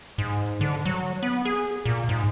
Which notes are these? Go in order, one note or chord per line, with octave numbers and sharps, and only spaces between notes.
G#2
D3
F#3
B3
G#4
A#2
G#2